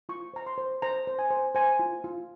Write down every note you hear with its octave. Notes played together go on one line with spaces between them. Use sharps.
F4 C#6
C5 A#5
C6
C5
C5 A#5
C5
G#5
C5
C5 G#5
F4
F4